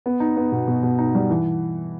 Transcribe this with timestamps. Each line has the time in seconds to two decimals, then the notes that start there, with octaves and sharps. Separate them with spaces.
0.06 B3
0.20 D#4
0.37 B3
0.52 B2
0.68 B2
0.83 B2
0.98 D#4
1.15 G3
1.30 E3